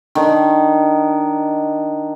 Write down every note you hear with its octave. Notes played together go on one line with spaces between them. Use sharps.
D#3 D4